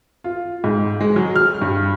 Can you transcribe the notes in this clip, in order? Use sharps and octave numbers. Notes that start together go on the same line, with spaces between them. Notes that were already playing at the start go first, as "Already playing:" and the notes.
F4
G#2
G#3
F#3
F6
G2